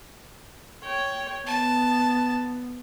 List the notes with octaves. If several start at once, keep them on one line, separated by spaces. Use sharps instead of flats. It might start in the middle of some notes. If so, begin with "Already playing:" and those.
C#5 G5
B3 A5